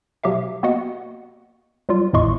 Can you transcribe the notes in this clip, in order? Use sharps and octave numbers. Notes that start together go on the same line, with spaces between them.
B2 F#3 G4 E5 F5
A#3 B3 F#4 D#5 F#5
F#3 G3 F4
G#1 E2 A2 D#5 C6 C#6